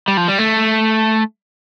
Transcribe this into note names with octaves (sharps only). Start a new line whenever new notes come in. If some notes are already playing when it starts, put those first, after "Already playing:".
G3
F3
G3
A3